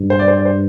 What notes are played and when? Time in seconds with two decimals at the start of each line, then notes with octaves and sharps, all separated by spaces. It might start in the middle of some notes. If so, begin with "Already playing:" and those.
Already playing: G2
0.10 C5
0.19 D5
0.28 C5
0.37 D5
0.45 C5